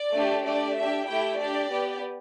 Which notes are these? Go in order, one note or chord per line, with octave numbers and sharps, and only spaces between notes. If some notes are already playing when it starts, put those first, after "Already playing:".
Already playing: D5
A3 D4 G4
A3 D4 G4 D5
D4 G4 E5
A3 E4 G4 G5
D4 G4 D5
B3 G4